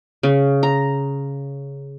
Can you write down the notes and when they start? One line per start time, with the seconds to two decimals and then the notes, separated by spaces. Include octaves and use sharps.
0.23 C#3
0.63 A#5